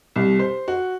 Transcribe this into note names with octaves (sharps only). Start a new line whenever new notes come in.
C2
C5
F#4